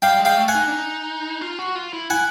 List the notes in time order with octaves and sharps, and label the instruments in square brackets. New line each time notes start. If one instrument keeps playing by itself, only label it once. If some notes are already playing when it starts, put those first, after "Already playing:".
[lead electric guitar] G3 [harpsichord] F5 G5
[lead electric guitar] G#3
[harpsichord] F5 G5
[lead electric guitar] A3
[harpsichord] F#5 G#5
[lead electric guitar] D#4
D4
D#4
F4
F#4
F4
E4
[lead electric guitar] E4 [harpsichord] F#5 G#5